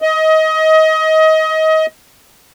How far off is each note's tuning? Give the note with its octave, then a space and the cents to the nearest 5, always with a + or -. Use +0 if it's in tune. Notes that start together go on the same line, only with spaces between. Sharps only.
D#5 +25